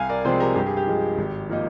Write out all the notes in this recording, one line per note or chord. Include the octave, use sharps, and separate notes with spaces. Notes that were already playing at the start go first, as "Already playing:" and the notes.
Already playing: C2 F5 G#5
A#4 D5
C3 F3 G#3 C4 G#4 C5
G4 A#4
G2 G4
G#4
G4
F3 G#3
G#1
F3 A#3 D#4